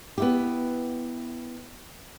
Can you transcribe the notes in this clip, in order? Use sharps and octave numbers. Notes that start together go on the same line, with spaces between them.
B3 E4 G4